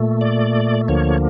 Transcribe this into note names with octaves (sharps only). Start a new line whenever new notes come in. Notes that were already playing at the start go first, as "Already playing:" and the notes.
Already playing: A#2 A3
D5
D2 D3 F3 A#3 C#5